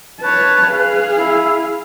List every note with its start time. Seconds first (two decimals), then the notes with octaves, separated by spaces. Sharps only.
0.21 B4 C#5 A5
0.71 G#4 F5
1.16 E4